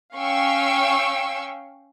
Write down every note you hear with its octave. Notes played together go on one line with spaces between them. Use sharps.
C#4 F5 G5 C#6 E6